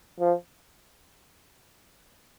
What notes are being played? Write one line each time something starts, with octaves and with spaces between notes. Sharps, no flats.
F3